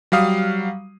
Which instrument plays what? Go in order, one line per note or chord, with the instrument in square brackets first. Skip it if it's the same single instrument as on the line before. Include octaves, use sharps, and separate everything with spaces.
[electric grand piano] F#3 G3 F5 D#6